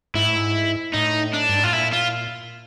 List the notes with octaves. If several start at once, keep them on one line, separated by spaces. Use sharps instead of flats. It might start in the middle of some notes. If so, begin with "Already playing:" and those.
G#2 E4
A2
G#2
A2 D#4
D4
G2
G#2
A2 F4
A#2 E4
F4